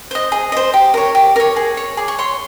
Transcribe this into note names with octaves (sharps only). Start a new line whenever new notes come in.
C5 D#5
G#4
C5 D#5
G4
A#4 C#5
G4 C#6
A#4 C#5 D6
G#4
C#5
G#4 D6
C#6
C#5 C6